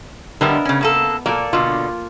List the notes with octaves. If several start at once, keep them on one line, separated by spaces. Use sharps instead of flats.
D3 G3 G#3 B3 A#4 E5
C#3 C#4
C#3 A#3 A4
A#2 A#3 A4 D5
B2 D3 F4